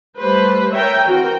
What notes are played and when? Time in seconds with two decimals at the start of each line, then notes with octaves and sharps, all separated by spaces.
0.18 G3 A3 B4 C5
0.73 A#4 C#5 E5 G5 G#5 A#5
1.07 E3 C4 F#4 A#4 G5